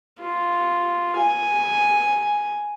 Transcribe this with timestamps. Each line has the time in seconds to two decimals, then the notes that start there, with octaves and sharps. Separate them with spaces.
0.21 F4
1.17 G#5